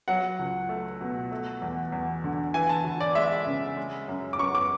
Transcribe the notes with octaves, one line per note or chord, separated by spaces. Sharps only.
F#3 F#5
C#2
A3
B2
A3
E2
E2
D3
E3 G#5
A5
D2
D5
G#3 E5
C#3
G#3
F#2
D6
F#2 C#6
D6